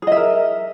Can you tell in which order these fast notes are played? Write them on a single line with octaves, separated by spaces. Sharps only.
G#4 D#5 E5 A#4